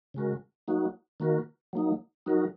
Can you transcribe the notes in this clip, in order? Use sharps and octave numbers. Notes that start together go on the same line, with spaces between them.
C#3 G#3 F#4 A#4
F#3 A#3 D#4 F#4
D#3 A#3 F#4 A#4
F#3 A#3 D#4
F#3 D#4 F#4 A#4